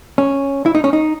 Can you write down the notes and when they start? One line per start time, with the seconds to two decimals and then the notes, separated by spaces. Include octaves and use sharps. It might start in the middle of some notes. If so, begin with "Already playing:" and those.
0.18 C#4
0.66 E4
0.75 D#4
0.84 C#4
0.93 D#4